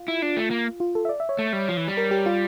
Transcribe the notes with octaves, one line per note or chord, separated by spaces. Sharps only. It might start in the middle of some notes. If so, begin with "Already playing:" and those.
Already playing: F4
E4
D4
A3
A#3
F4
A4
E5
D5
E5
C#5
A3
G3
F3
E3
G3
A#4
G4
F4